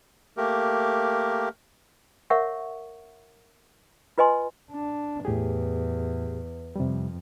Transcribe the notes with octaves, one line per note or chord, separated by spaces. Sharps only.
A3 A#3 G4 A#4
A#4 C#5 E5 F#5 C#6
F4 B4 D#5 G#5 C6
D4
E2 A2 G4 G#4
F2 C3 G3